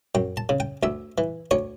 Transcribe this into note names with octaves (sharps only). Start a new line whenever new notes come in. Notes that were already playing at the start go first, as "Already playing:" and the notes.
F#2 G5
A5
C#3
G5
D2 E5
E3
D2 C#5